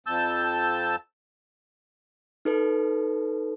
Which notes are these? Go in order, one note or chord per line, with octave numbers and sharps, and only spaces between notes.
F2 A5 E6 G6
D#4 A4 B4